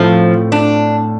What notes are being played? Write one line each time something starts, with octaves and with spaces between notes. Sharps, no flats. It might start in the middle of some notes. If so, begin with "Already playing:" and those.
Already playing: A2 F3 A3 C4 F4
D4